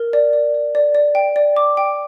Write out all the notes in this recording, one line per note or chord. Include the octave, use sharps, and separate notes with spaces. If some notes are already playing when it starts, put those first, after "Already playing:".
Already playing: A#4
D5
D5
D5
D5
D5
G5
D5
D6
G5